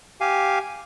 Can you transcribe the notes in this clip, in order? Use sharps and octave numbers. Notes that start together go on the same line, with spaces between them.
G4 F5 G#5